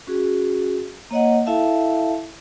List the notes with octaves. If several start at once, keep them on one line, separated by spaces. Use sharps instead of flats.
C#4 F#4 G#4
A#3 C#5 D#5 F#5
E4 A4 E5 F5 A5